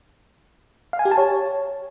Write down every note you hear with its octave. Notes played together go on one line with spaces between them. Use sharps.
F5
G#5
G4
A5
C#5